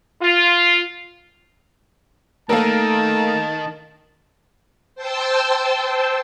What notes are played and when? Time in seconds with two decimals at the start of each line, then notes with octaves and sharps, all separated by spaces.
0.22 F4
2.49 D#3 A3 A#3 A4 A#4 A5
4.95 C5 G5 A5 C6 E6